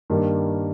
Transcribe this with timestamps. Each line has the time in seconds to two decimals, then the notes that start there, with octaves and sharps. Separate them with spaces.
0.10 G2 D#3 G3 A#3